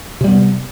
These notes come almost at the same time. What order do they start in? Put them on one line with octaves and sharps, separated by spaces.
C3 G3 B3